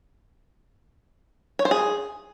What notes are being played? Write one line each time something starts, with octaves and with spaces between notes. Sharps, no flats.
C#5
C5
G#4